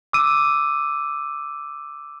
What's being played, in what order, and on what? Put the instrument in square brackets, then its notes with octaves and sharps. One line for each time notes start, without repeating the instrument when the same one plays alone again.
[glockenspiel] D6 E6 D#7